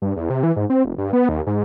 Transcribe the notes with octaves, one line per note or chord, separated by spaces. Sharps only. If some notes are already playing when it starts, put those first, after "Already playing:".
G2
E2
C3
E3
G#2
C4
F1
G2
B3
D#2
G#2